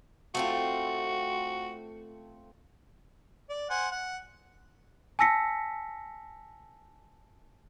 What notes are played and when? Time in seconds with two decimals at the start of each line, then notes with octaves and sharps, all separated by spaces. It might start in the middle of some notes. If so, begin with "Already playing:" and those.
0.35 A3 C4 F4 F#4
3.49 D5
3.70 C5 F#5 G#5
3.91 F#5
5.19 G#5 A5 E6 A#6 B6 C#7